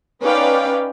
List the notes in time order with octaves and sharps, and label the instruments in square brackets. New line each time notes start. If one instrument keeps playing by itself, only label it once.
[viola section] C#4 D#4 B4 D5 F5 G5